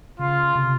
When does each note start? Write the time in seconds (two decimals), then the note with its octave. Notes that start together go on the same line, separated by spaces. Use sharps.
0.19 C#3 F4
0.56 C3